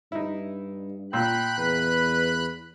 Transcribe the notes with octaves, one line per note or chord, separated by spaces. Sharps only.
G2 D#4 E4
A#2 G5 B5 E6 F#6
E2 B4